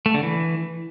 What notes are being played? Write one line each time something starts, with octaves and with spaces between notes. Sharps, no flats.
A3
D3
E3